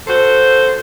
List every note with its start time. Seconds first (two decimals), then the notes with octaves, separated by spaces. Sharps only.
0.07 F#4 A4 C5